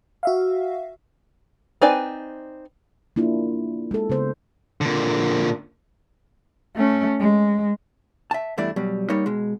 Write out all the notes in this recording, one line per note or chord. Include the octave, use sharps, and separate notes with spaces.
F#4 E5 F5
C4 D#4 B4 D5 G#5
A#3 D4 E4 F4
G#3 A4
C#3 B3 C5
A#2 D3
A3 C#4
G#3
E5 A5
E2 G2 A3 D4 E4 D5
B2 F#3 G3
G3 A#3 D#4 C#5
B2 G#3